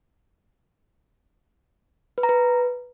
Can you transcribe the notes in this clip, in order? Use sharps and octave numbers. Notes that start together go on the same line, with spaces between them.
B4
A#5
B4